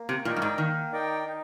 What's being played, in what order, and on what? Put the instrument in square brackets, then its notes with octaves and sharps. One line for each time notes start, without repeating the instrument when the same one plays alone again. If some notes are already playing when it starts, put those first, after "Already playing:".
Already playing: [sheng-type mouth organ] A#3
[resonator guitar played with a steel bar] C3
[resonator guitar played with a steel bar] A#2 [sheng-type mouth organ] D#4 A#4 D5 G5
[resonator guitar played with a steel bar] G2
G#2
[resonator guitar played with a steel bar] D#3 [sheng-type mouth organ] A#3
[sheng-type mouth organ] D#4 A#4 D5 G5
D#4